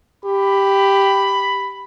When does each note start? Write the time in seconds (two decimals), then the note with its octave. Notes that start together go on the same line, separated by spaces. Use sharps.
0.25 G4 B5